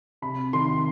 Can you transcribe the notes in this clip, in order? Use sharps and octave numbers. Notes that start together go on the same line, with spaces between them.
C3 B5
D#3 C6